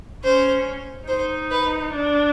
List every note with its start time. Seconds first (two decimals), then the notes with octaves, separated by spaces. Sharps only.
0.24 C#4 C5
1.08 D#4 C5
1.51 B4
1.94 D4